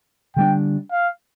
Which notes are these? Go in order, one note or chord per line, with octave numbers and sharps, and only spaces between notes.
D3 G3 D4 G5
F5